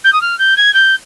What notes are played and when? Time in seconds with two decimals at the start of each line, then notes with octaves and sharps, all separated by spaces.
0.04 G6
0.12 D#6
0.21 F6
0.38 G6
0.56 G#6
0.73 G6